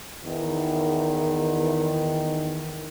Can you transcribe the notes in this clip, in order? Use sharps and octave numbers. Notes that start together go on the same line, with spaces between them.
E2 D#3